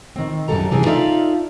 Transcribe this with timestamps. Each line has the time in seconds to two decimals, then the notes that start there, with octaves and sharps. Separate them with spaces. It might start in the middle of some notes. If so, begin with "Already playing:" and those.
0.16 D#3 C4
0.48 F#2 C#3 F3 G3 A4 A#5
0.71 C3 E3 F3 G3 G#4
0.86 D#4 F4 A4 D5 E5 F5